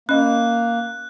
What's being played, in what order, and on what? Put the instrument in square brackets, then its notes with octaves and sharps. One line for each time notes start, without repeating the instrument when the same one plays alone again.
[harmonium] A#3 [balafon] C#4 D#5 [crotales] F#6